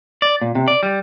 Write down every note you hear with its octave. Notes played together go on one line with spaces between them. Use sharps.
D5
A#2
C3
D5
G3